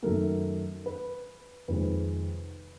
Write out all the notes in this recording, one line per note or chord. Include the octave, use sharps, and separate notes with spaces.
F#2 D#3 F#3 A3 A#4
B4
F2 C3 D#3 G#3 B4